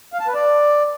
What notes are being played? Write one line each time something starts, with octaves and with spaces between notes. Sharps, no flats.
F5
A5
B4
D5